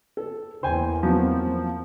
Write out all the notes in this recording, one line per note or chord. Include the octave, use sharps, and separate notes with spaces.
A4
E2 A#3 C5 G5 G#5
F3 F#3 B3 C4